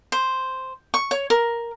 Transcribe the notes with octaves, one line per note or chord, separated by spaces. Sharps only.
C5
C#6
C#5
A#4